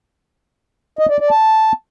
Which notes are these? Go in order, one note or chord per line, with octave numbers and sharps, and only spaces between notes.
D#5
D5
D5
A5